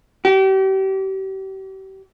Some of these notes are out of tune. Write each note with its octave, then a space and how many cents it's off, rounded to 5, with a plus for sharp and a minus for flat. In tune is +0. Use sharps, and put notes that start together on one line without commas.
G4 -35